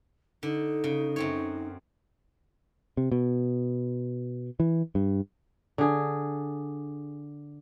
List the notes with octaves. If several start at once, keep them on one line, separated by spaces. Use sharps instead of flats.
D3 D#4
C#3
F#2 C4 C#5
C3
B2
E3
G2
D3 G#4